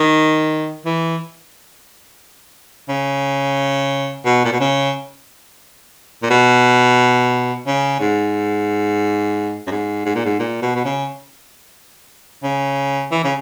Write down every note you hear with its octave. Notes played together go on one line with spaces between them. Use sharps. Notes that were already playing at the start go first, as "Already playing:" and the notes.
Already playing: D#3
E3
C#3
B2
A#2
B2
C#3
A#2
B2
C#3
G#2
F#2
G#2
G#2
A#2
G#2
A#2
B2
B2
C#3
C#3
E3
C#3